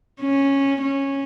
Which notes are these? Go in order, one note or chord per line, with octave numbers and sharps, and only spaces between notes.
C#4
C#4